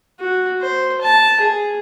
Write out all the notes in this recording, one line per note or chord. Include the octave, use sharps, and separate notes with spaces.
F#4
C5
A5
G#4